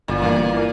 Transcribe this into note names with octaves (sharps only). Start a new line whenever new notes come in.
G1 A#2
G2 E3 A#3
G1
E3 A#3